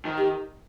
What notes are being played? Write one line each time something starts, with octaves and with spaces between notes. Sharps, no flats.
D#3
G4